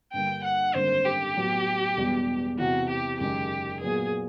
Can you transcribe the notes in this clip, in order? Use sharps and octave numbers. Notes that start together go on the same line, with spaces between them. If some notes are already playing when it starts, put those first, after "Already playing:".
G2 D3 G3 A#3 G5
F#5
G#1 F#2 D3 G3 A#3 C5
G4
A2 F#3 B3
E1 E2 B2 G3
E2 C3 E3 F#4
G4
F#1 F#2 D#3 G#3 G4
A#2 F#3 B3 G#4